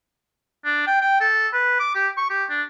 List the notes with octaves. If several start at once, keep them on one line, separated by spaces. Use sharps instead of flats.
D4
G5
G5
A4
B4
D6
G4
C#6
G4
D4